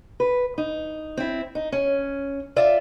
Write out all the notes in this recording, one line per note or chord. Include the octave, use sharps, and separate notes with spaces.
B4
D#4
C4 E4
D#4
C#4
F4 D5 E5